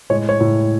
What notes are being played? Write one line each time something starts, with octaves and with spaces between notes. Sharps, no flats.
A2 G#3 C#5
C#5
A2 G#3